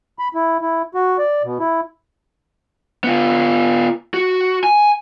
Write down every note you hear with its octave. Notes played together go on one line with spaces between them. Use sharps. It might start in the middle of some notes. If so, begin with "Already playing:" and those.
B5
E4
E4
F#4
D5
B2
E4
B3 F4
F#4
G#5